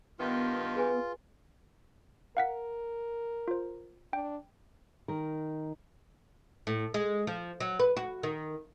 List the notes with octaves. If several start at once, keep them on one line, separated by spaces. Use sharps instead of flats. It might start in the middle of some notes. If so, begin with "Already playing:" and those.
G2 D#3 B3 F4
G#4 B4 G#5
A#4 F5 F#5 B6
F4 C5
D4 G5
D#3 A#4
A2
G#3
F3
F#3
B4
F#4
D#3